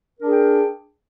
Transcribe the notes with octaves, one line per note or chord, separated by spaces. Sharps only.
D4 G#4 A#4 G5